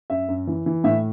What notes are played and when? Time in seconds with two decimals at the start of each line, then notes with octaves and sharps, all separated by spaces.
0.10 F#2 E5
0.28 F#2
0.47 E3
0.66 E3
0.84 A2 E5